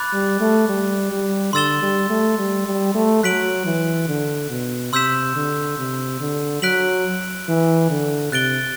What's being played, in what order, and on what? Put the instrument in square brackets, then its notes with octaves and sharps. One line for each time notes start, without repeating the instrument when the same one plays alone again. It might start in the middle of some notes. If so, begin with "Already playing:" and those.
Already playing: [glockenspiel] B5 D6 F#6 A6
[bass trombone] G3
A3
G3
G3
[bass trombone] D3 [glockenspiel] C6 E6 A6 E7 G7
[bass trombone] G3
A3
G3
G3
A3
[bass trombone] F#3 [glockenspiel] F#6 B6 D7 F#7
[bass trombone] E3
D3
B2
[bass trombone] C3 [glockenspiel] C6 E6 G6 B6 E7
[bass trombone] D3
C3
D3
[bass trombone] F#3 [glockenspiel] F#6 B6 D7 F#7
[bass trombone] E3
D3
[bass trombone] C3 [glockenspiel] F#6 A6 D7 G7